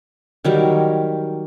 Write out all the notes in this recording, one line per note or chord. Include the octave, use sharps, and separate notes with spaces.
D#3 F#3 G3 A#4